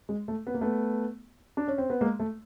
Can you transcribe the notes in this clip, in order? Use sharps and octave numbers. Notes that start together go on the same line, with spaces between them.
G#3
A3
B3
A#3
A3 B3
D4
C#4
C4
B3
G#3 A#3
A3